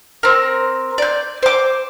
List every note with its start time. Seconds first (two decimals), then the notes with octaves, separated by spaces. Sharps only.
0.23 C4 A#4
0.98 D5 G6
1.43 C5 D6